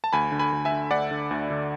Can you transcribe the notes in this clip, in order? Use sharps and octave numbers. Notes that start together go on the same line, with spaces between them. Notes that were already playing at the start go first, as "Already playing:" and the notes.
A5
D2 G#5 B5
D3
G#5 B5
D2
E5 G#5
D3
D2 D5 F#5
D3
D2
D3